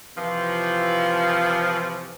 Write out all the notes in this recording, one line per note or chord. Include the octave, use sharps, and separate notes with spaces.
C3 E3 F3